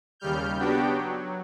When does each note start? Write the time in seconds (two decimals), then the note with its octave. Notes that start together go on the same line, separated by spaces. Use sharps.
0.20 D#2 C#3 G3 F6 G6
0.58 B3 D4 F#4 G4 G5
0.88 F#3